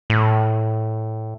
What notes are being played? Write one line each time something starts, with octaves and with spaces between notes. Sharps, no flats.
A2